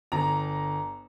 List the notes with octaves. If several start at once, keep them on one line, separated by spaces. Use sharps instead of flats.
G1 A#5